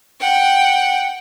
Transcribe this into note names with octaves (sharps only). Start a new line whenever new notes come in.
F#5 G5